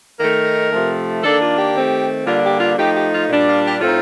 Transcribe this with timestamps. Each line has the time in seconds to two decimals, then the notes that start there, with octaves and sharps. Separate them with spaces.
0.20 D#3 A3 D#4 A#4
0.72 C3 F3 A3
1.23 D#3 A#3 D4 A4
1.41 F4
1.57 G4
1.75 D#3 A3 C4
2.26 D3 G3 A#3 D4 F4
2.43 G4
2.60 F4
2.78 F3 A3 D#4 G4
2.95 G4
3.12 F4
3.29 A#2 G3 D4
3.47 F4
3.63 G4
3.80 A2 A3 C4 D#4 F4